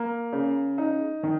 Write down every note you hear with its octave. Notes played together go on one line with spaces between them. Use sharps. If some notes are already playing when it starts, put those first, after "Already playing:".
Already playing: A#3
C#3
D#4
D#3